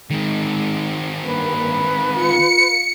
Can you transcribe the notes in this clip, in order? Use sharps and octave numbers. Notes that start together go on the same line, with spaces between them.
D#3 G#3 C4
G2 A#3 B4
F4 C#7